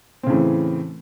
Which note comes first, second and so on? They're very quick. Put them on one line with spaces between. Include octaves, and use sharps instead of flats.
C4 C#3 A2 E3